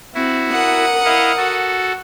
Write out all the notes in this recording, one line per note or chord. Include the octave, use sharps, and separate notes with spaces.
C4 E4 F#4
A#4 F#5 D#6
E4 D#5 F5
F#4 A4